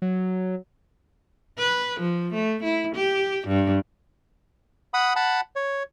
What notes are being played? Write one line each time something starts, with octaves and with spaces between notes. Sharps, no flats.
F#3
B4
F3
A3
E4
G4
G2
F#5 B5 D#6
F#5 A5 B5
C#5